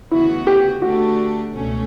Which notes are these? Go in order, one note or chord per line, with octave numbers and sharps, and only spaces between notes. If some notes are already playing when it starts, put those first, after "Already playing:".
D2 C#3 E3 B3 E4 F#4
G4
D3 A3 D4 F#4 G4
C#2 B2 A3 C#4